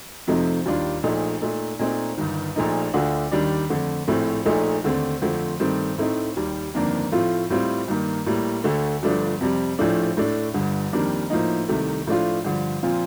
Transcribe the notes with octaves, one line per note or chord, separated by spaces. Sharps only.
F2 C3 F3 A3 D#4
D#2 D#3 G3 D4 F4
A#1 A#2 A3 D#4
A#2 A3 D#4
A#2 A3 C4 D#4
G1 G2 D#3
A#1 A#2 A3 D#4
D2 D3 A3 D4 F4
D#2 D#3 G3 D4
F2 D3 A3
A#1 A2 A3 C4
A#1 A#2 A3 D#4
D#2 D3 A3 C4
F2 D3 F3 A3 C4
G2 D#3 A3 C4
A2 A3 C4 D#4
D#2 D#3 G3
G1 F2 D#3 A#3 D4
A2 F3 A3 C4 F4
A2 G3 C4 F4
G2 D#3 A#3
A2 G3 A#3
D2 D3 A3
G1 G2 F3 A3 D4
F2 C3 G3
A#1 A2 F3 A3 D4
A2 A3 D4
G1 G2 D3
F2 D#3 G3 A#3 D4
A2 F3 A#3 D#4
C2 C3 D#3 A3
A2 F3 A3 D4 F4
G2 D3 F3
A#2 F3 C4 F4